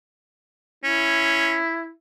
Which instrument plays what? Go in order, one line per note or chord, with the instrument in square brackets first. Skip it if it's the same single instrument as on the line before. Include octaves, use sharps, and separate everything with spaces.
[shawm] C#4 [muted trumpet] E4